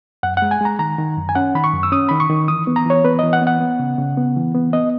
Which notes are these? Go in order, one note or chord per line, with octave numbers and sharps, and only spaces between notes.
F#2 F#5
G#3 F#5
G#5
G#3 A#5
D#3 A#5
D#3
F#2
G#5
C#4 F#5
D#3 B5
C#6
F#2
E6
C#4 D#6
D#3 B5
C#6
D#3
E3 D#6
B3
A#5
E3 C#5
B3 B4
E3 D#5
F#5
B3
F#5
B3
C#3
C#3
B3
E3
B3
B3 D#5